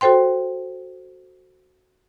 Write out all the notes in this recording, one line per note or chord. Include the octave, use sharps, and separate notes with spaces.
F#4 A4 C5 G5 C6